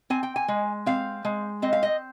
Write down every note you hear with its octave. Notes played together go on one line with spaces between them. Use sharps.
C4 G#5
G5
G#5
G#3
C4 F5
G#3
C4 D#5
F5
D#5